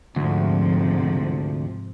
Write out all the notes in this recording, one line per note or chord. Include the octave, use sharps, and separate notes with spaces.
D2 G#2 C3 F3